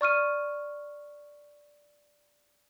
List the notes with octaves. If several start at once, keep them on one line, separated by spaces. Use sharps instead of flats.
D5 C#6 F6 D#7